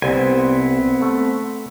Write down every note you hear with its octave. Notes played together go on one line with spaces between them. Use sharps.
C2 B3 C4 G#5
A3